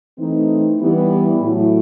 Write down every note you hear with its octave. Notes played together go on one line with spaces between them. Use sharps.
E3 A3 C4 D#4
E3 G3 B3 E4 G4
A2 F#3 A3 E4